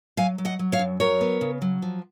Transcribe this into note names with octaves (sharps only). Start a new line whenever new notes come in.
F#3 F5 G#5
F#3
D#5 F#5
F#3
C#5 F5
F#2
F#3 A#4 C#5
B3
C#3
F#3
F3